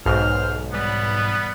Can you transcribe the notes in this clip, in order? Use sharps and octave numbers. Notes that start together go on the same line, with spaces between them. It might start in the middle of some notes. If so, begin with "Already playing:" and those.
B1 G#2 C5 F6
E3 G3 B3